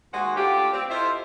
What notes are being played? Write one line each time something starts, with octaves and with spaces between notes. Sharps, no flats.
D#2 G#3 F#4 C5 F#5
A3 D4 F4 G4
C4
E4 F4 A4 C5 D#5 E5